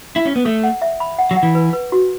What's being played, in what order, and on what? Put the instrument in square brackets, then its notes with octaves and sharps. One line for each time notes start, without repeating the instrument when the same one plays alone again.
[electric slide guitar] E4
C#4
B3
[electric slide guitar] A3 [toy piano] A4
[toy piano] F#5
E5
B5
F#5
[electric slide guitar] F#3
[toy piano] F#5
[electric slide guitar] E3
[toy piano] B4
B4
F#4